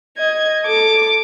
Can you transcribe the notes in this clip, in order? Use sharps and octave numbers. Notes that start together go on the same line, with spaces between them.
D#5 G#6
A4 D6